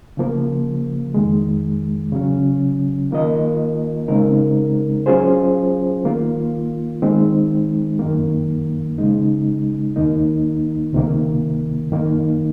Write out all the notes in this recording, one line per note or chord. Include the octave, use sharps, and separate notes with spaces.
C#3 F3 A#3
F2 D#3 G#3
C#3 F#3 C#4
D#3 A#3 F4 A#4 D#5
C#3 G#3 C4 D#4 A#4
F#3 C#4 F4 G#4 C5
D#3 A#3 F4
D#3 G#3 C4 D#4
F#2 D#3 A#3
C#3 G#3 D#4
D#2 D#3 A#3 D#4
C#2 C3 D#3 A#3
F#2 D#3 A#3 D#4